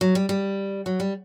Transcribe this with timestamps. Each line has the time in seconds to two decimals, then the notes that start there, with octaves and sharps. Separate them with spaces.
0.01 F#3
0.15 G3
0.29 G3
0.86 F#3
1.00 G3